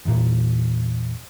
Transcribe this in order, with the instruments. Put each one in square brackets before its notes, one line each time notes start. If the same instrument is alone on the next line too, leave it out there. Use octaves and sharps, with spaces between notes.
[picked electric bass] E2 A#2